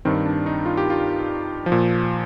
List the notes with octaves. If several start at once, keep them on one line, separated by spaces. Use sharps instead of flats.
G2 D#3 C4
D4
D#4
F4
G4
F4
F3
A#2